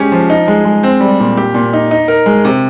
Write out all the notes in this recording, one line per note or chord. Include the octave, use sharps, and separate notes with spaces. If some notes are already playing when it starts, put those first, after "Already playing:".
Already playing: G#3 C#4 G4
F3
D#4
G#3
G#3
C4
G3
A#2
G4
A#2
D#4
D#4
A#4
G#3
C3